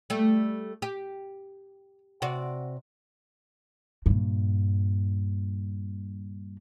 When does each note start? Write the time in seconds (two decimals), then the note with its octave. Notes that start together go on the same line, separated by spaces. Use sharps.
0.10 G3 A3
0.82 G4
2.22 C3 F#4 D5
4.06 G2 A#2